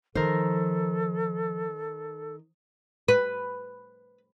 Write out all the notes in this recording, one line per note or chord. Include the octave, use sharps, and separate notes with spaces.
D#3 F3 A4 A#4 C5
B4